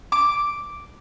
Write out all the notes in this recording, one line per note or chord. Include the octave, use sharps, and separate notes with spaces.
D6